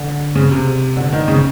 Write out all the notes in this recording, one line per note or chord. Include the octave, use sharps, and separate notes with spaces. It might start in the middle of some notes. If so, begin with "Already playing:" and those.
Already playing: D3
C#3
C3
D3
D#3
C#3